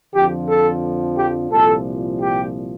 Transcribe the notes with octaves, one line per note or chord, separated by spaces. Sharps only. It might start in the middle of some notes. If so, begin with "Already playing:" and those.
F2 D3 F3 G4
A4
G4
C2 A#2 F3 A4
G4